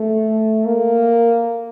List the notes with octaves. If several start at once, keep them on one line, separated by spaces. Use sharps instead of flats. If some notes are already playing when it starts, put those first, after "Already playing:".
Already playing: A3
A#3